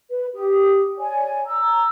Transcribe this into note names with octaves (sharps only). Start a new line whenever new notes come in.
B4
G4 D#6
C#5 D5 G#5
A#5 E6